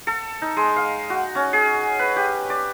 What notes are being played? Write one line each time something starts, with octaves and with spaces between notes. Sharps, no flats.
A4
D#4
G#3
F5
F#4
C#4
G#4
B4
G4
D5